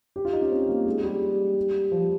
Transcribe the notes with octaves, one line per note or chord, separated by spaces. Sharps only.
G4
F4
D#4
C#4
C4
A#3
G#3
G3
F3